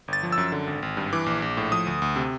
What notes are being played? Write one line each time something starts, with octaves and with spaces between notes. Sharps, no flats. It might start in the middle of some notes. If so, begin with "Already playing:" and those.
G1 A6
F3
E6
F#2
D3
G#1
G#1
G2
E3 D6
A#1
A#1
A2
F3 D#6
D2
D2
C3